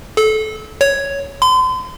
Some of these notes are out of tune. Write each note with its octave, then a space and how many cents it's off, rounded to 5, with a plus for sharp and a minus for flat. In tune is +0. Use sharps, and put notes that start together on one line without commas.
A4 -25
C#5 +5
C6 -40